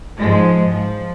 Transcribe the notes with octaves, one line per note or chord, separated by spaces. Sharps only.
G#2 F3 G#3
F3